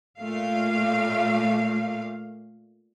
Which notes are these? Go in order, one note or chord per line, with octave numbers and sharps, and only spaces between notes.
A#2 A3 F5